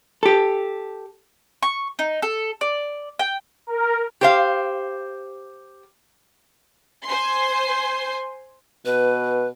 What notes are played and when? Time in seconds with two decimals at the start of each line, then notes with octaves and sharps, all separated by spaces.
0.23 G4 A4
1.63 C#6
1.99 D#4
2.22 A4
2.61 D5
3.19 G5
3.67 A#4
4.21 G4 C5 F5
7.06 C5 G#5 C6
8.85 B2 B4